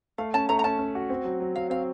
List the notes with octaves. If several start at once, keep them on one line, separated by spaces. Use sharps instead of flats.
A3 F5
C#4 A5
A3 A#5
A#5
C#4 A5
C#4
F#4
C4
F#3
F#3
F#3 F5
C4 F5